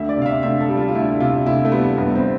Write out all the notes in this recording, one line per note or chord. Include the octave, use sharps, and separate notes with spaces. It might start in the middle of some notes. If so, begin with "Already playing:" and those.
Already playing: D2 E5
D5
C3 F5
E5
D2 E5
A4
G3
F4
F4
D2 E4
C3 F4
D2 E4
A3
G3 B3
G1 B3
C4